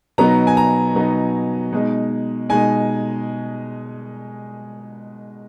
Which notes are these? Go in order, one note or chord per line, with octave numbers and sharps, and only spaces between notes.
B2 F#3 B3 D#4 A#5
G#5
A#5
B2 F#3 B3 D#4
B2 G#3 D#4
B2 G#3 D#4 G#5